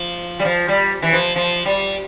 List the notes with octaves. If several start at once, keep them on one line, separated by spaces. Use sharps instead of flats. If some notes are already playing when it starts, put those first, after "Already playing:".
Already playing: F3
G3
F3
G3
E3
F3
F3
G3